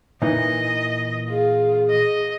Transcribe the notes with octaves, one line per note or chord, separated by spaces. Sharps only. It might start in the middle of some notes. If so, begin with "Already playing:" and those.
A#2 E3 D#4 D#5
F4 G#4
D#5